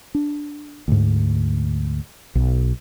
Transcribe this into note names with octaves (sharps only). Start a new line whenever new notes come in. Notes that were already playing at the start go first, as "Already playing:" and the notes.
D4
D2 G#2
B1